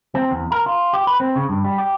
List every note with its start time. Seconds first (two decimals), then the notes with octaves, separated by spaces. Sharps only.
0.15 C4
0.31 E2
0.52 A#4
0.66 F4
0.93 G4
1.07 B4
1.20 C4
1.36 C#3
1.49 G2
1.65 G3
1.78 G4